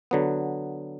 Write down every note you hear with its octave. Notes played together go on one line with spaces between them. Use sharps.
D3 F#3 B3